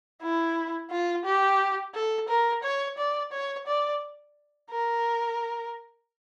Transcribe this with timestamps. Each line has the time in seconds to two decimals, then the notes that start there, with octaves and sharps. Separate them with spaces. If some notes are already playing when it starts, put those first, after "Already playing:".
0.22 E4
0.91 F4
1.25 G4
1.95 A4
2.29 A#4
2.64 C#5
2.98 D5
3.33 C#5
3.67 D5
4.71 A#4